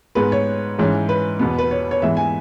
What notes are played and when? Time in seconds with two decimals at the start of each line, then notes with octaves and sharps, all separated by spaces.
0.15 G#2 G#3 B3 B4
0.32 C#5
0.79 G#2 E3 C#4
1.09 B4
1.39 E2 B2 B3
1.59 B4
1.71 C#5
1.91 C#5
2.02 G#2 E3 B3 E5
2.17 G#5